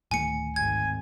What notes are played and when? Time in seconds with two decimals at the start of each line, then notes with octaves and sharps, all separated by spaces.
0.11 D1 D#3 A3 G#5 C#7
0.56 G#1 G#5 G#6